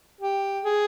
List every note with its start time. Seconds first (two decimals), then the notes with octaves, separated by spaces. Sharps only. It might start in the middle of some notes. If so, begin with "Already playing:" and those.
0.21 G4
0.64 G#4